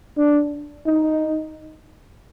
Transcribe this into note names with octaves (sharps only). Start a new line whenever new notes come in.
D4
D#4